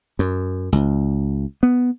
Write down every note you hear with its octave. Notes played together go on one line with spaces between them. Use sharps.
F#2
C#2
B3